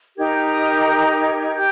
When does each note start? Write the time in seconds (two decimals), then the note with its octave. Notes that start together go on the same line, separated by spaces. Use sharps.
0.17 D#4 G4 A#4 G#6
0.35 G6
0.52 D#6
0.69 G6
0.86 G6
1.03 G6
1.21 G#6
1.37 G#6
1.55 G4 G6